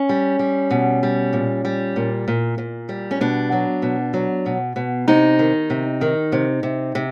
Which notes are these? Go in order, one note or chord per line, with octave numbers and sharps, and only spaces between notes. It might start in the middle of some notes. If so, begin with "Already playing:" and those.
Already playing: C#4
G3
G3
B2
G3
A#2
G3
A#2
A#2
A#2
G3
C#4
B2 D4
F#3
B2
F#3
B2
B2
C3 D#4
D#3
C3
D#3
C3
C3
C3